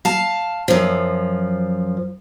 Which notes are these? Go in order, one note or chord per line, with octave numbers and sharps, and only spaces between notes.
F5 A5
F#2 F3